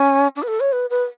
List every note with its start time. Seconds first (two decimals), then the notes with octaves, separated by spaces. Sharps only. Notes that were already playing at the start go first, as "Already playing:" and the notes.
Already playing: C#4
0.36 D4
0.43 B4
0.48 A4
0.60 C#5
0.72 B4
0.90 B4